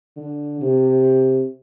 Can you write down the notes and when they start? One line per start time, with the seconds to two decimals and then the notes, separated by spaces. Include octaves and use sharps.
0.17 D3
0.61 C3